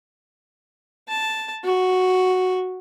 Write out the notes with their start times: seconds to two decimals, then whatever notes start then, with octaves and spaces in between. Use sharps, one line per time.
1.08 A5
1.64 F#4